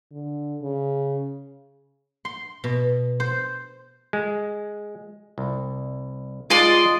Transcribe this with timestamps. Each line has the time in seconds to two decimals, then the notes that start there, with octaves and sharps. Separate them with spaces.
0.12 D3
0.62 C#3
2.25 C6
2.64 B2
3.20 C5
4.13 G#3
5.38 C2
6.50 G#3 F4 D5 D#5 C6